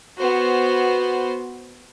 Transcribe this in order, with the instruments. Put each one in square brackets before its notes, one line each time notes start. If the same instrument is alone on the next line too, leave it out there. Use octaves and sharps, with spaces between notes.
[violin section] B3 C5 [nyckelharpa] F#4